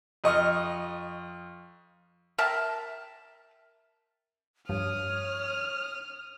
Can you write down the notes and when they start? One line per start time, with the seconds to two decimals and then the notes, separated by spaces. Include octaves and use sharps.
0.24 F2 D#5 C#6 F6
2.38 A#4 E5 G5 A5
4.69 G2 F3 C#5 D#6 F6